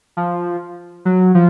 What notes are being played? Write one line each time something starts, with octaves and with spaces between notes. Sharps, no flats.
F3
F#3
F3